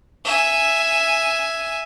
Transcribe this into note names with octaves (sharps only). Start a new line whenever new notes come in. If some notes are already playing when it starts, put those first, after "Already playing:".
E5 G#5